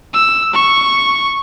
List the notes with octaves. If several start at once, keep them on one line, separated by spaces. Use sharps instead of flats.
E6
C#6